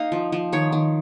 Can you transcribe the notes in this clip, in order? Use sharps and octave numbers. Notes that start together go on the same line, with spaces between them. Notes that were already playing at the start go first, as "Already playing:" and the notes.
Already playing: A#3 D#4 D#5 F5
F3
F3
D#3 C#5
D#3